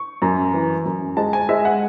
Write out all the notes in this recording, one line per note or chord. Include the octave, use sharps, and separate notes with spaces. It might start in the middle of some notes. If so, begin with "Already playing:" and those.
Already playing: C#6
F#2
E3
F#2
G#3 A5
G#5
G#3 E5
F#5